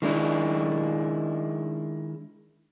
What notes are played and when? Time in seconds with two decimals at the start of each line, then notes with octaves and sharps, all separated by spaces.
0.02 D#3 G#3 D4 E4